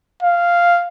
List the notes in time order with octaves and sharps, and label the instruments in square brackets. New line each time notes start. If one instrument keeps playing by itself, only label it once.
[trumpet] F5